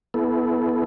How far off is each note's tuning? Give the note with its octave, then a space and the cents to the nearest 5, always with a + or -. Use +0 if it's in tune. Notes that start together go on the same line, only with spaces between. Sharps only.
B3 +0 E4 -5 A4 -35